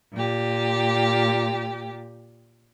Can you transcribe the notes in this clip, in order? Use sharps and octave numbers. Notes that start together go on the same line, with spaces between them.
A#2 G4